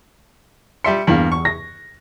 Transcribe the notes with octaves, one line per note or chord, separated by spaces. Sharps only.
G3 E5 C6 C#7
E2 G2 A#3 F#7
C#6
A#6